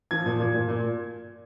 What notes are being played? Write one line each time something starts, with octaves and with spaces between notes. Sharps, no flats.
F3 G#6
A#2
A#2
A#2
A#2